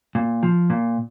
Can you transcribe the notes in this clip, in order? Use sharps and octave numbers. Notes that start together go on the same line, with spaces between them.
A#2
F3
A#2